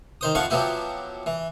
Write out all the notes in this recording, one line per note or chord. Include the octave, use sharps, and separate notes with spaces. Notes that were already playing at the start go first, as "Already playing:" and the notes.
D#3 C5 D#6
F2 F3 E4 F5 F#5 C#6
F3 F#3 B3 E4 G4
E3